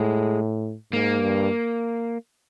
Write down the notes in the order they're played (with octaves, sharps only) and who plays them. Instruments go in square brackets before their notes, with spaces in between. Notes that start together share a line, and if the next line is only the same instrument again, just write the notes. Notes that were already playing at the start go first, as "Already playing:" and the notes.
Already playing: [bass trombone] A2 [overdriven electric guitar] G#3
[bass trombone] G#2 [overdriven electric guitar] A#3
[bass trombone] G2